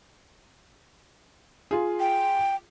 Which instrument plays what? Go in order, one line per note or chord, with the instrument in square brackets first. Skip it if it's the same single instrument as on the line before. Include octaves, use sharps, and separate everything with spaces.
[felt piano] F4 G#4
[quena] G5